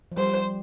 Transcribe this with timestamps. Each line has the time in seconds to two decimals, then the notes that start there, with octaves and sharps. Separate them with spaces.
0.12 F3
0.17 G3 C5